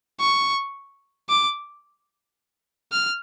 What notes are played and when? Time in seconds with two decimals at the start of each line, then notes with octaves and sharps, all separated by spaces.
0.20 C#6
1.29 D6
2.92 F6